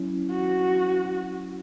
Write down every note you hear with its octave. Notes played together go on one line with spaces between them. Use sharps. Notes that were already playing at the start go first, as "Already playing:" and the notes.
Already playing: F#3 C#4 E4
F#4